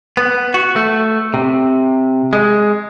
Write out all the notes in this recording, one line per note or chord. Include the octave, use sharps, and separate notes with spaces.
B3
F#4
A3
C3
G#3